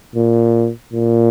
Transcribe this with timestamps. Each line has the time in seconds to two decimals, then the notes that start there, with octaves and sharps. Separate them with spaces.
0.16 A#2
0.93 A#2